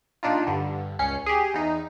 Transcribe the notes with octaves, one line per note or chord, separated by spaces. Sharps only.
A#2 D4 D#4 F4
G2 D3
C#2 C#4 C7 C#7
G4 G#4
E2 D#4